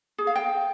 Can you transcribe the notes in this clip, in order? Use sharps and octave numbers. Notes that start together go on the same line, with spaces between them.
G#4
F5
G5